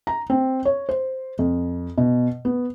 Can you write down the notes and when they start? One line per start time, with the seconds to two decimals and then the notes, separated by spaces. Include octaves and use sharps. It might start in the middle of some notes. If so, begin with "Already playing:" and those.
0.07 A#5
0.30 C4
0.65 C#5
0.89 C5
1.39 F2
1.98 B2
2.45 B3